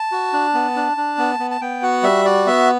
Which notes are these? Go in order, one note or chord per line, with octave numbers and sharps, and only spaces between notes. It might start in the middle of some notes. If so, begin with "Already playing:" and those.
Already playing: A5
F#4
D4
B3
D4
D4
B3
B3
A5
B3 G5
F#4 F#5
G3 E5
F#4 D5
B3 E5